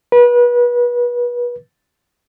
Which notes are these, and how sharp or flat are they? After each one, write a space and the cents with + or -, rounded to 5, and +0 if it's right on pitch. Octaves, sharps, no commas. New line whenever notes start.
B4 -30